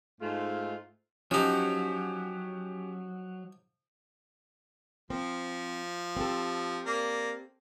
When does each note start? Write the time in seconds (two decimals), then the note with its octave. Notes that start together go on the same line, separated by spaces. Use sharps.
0.21 G#2 A3 F4
1.31 F3 F#3 C#4 D#4 G4
5.10 F3 C4
6.17 C4 G4 A4
6.86 A#3 A#4 D5